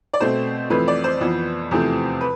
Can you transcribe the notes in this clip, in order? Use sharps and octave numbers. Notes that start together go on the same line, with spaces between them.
D5
B2 A3 C4 C5
F2 E3 A3 C4 B4
D5
C5
F2 E3 B3
E2 C3 F3 A3 C4
B4